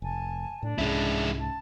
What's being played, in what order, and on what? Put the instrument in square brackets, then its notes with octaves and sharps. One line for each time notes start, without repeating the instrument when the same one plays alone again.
[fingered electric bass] F1 [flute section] G#5 A5
[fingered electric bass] A2 [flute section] D4
[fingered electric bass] C2 G#2 C#4 [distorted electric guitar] G#3 E4
[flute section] A5